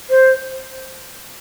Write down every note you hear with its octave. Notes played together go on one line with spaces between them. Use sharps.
C5